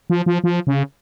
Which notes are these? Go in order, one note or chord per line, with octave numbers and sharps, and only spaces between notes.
F3
F3
F3
C#3